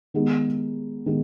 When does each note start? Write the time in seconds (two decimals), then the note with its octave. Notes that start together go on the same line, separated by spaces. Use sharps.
0.14 D#3 G#3 B3 D#4 G#4
1.06 D#3 G#3 B3